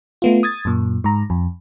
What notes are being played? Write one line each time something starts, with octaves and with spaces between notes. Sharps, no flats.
A3 B3 F4
D#6 G#6 A6
F#2 A#2
G#2 A#5
F2